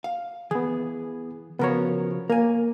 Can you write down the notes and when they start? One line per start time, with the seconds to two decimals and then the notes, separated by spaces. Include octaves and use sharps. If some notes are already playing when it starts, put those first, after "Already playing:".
0.04 F5
0.51 E3 B3 G#4
1.59 C#3 F3 B3 F#4 A#4 C#5
2.30 A#3 A#4 G#5